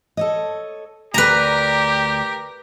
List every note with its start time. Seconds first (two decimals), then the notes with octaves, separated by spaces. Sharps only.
0.17 A4 C#5 D#5
1.14 D2 G4 A#4 B4 D5 A#5